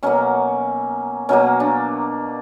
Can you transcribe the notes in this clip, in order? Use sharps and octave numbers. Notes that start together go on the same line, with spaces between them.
B2 F#3 A#3 C#4
B2 F#3 A#3 C#4
D4